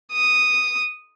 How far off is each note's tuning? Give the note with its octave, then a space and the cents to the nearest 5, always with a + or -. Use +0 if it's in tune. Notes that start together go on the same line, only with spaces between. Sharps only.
D#6 -5